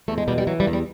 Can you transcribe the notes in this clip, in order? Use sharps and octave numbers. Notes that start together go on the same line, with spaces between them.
E2 A3
G#3
B2 G3
G3
E3 F#3
G3
E2
G3